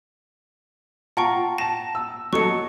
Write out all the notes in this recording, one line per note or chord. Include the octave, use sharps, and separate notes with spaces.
F4 F#5 G5 A5 A#5 C#6
A5 A#6 E7
E6
F#3 A4 D#5 C#6 C#7